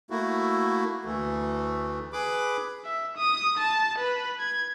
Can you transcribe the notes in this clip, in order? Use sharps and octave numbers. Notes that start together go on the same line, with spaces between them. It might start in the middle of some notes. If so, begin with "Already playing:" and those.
A3 A#3 E4 F#4
D2 E3 A3
G#4 B4 B5 D6
E5
D#6
A5
B4
G#6